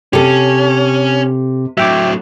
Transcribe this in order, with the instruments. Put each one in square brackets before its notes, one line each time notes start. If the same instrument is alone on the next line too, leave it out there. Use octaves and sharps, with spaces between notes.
[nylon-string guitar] C3 A4 [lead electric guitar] C#4 [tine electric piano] G4
[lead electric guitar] A2 F#3 [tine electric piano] E5 G5 D6